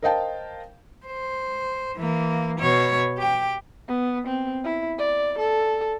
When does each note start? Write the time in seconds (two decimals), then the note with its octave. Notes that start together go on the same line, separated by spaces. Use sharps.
0.02 A#4 C5 D#5 F5 G5 A5
1.06 C5
1.96 E3 A#3
2.59 B2 C#5
3.18 G4 G5
3.88 B3
4.27 C4
4.64 E4
4.99 D5
5.39 A4